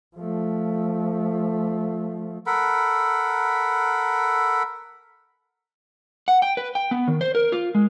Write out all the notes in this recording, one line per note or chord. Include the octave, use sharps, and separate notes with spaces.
F3 A3
A4 A#4 F#5 B5
F#5
G5
B4
G5
B3
D#3
C5
A#4
F4
G#3